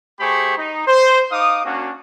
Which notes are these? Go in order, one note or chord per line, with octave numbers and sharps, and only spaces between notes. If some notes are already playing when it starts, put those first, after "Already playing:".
A3 G4 G#4 C5 B5 C#6
D#4
C5
D#4 F5 D6 D#6
A#3 C#4 D4 F#4